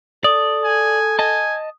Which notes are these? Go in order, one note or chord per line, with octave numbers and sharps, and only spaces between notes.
A4 D5 D#6
G#5
D#5 G#5 A5